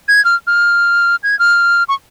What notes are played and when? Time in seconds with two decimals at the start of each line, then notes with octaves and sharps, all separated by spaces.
0.08 G#6
0.25 F6
0.47 F6
1.23 G#6
1.39 F6
1.89 C#6